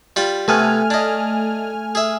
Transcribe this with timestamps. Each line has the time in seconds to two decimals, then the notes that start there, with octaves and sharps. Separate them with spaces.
0.16 G3 F4 B5
0.48 C3 A3 B3 G#5 F6
0.90 D4 D#5
1.95 G#4 E5